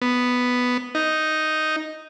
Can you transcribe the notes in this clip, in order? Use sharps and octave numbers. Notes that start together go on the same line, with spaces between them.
B3
D#4